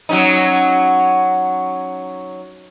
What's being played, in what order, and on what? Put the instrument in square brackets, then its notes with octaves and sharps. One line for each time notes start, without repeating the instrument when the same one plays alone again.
[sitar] F#3 C#4 D#4